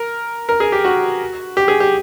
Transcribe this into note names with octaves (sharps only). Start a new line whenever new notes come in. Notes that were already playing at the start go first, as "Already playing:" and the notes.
Already playing: A#4
A#4
G#4
G4
F#4
G4
G#4
G4